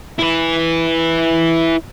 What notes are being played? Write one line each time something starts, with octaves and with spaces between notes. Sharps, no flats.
E4 B4